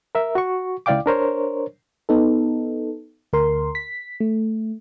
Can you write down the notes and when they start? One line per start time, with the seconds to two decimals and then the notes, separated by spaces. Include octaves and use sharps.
0.15 A#4 E5
0.35 F#4 C#6
0.86 C#2 E4 D5 F5 G5 D6
1.06 D4 A#4 C5 C#5
2.09 B3 D#4 A4
3.33 D2 A#4 C6
3.75 B6
4.20 A3